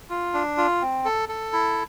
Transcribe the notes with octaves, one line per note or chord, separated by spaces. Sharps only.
F4
D4
F4
C4
A4
A4
E4